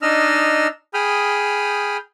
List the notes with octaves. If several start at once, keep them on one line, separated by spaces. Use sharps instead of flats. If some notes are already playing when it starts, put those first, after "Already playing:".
D4 D#4 D#5 E6 F6
G#4 G5 B5 D#6 F6